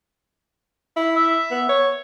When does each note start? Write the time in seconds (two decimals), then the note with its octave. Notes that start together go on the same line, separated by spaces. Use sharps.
0.97 E4
1.16 E5
1.51 B3
1.69 C#5